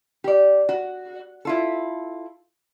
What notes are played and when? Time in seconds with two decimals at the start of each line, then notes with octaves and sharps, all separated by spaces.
0.24 G4 D5
0.69 F#4
1.45 E4 F4 A4